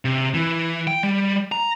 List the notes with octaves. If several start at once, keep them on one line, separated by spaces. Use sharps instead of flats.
C3
E3
G5
G3
A#5